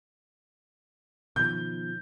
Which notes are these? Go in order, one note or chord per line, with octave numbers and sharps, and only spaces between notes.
B2 D#3 F3 G6